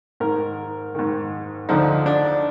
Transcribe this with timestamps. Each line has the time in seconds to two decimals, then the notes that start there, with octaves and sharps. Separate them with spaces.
0.20 G#2 D#3 A#4
0.95 G#2 D#3
1.69 D2 D3 F3 D#4
2.06 D4